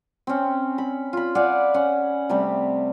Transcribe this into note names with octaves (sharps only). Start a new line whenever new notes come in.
C4 C#4
B5
F4 B5
D5 F5 F#5 G#5
C#4 F#5
C3 G3 A3